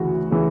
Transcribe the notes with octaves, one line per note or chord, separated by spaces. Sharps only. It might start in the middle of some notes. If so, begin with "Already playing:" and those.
Already playing: D2 C#3 E3 F#4
C#3 E3